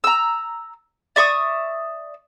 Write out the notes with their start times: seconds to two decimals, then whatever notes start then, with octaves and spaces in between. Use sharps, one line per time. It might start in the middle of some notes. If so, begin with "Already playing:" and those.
0.04 A#5 E6
1.16 D5 E5 C#6 D#6